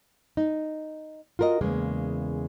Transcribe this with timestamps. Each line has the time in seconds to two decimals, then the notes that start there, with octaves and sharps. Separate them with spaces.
0.37 D#4
1.39 F4 F#4 A#4 B4 D#5
1.61 E2 C#3 G#3 A#3